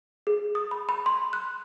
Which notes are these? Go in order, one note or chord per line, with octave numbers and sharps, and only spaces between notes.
G#4
D#6
B5
B5
C6
F#6